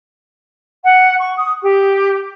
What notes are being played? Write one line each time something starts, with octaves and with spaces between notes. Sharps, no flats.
F#5
C#6
D#6
G4